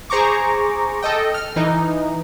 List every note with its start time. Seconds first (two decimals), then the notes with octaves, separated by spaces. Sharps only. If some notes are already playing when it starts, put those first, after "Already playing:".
0.10 G#4 C5 A#5 C#6 D6
1.02 A4 D#5 G5
1.34 F6
1.56 E3 D#4